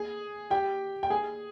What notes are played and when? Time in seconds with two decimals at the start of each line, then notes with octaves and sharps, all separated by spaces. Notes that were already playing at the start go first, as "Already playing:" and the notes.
Already playing: G#4 G#5
0.50 G4 G5
1.03 G5
1.10 G#4 G#5